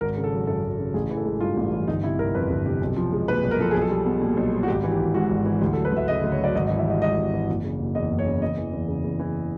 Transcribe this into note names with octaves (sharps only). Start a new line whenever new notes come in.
G#1 A#4
C#3
A4
F#3
F#2 A4
G#1
C#3
A1 G#4
E3
A4
G#3
G2 F4
A1
E3
G1 D#4
C3 E4
G1 A#4
F2 B4
G1
C3
B1
F3
G#3
A#2 B4
B1
A#4
F3 A4
B1 G#4
A4
G3
B3
A#2
B1
G3
F#4
G#1 G4
E3
G4
G#1
G#2 F#4
G#1
E3
D2 G4
A4
F#3
B4
D2 E5
C#3 D#5
D2
C#5
F#3 D5
G#1 D#5
D#5
E3
E5
G3 D#5
G#2 D#5
G#1
E3
F#1
C#3
F#1
E2 D#5
F#1
C#5
C#3
E2 D#5
E3
E2
C#3
E2
E3